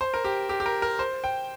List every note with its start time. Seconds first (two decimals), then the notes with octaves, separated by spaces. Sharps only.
0.01 C5
0.14 A#4
0.25 G4
0.49 G4
0.60 G4
0.66 A#4
0.82 A#4
0.99 C5
1.24 G5